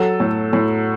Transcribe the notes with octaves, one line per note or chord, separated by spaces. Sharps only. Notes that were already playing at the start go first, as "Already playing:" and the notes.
Already playing: F#3 A4
A2
A2